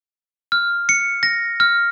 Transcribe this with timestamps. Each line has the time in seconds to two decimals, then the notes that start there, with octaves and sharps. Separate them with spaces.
0.52 F6
0.89 C#7
1.23 A#6
1.60 F6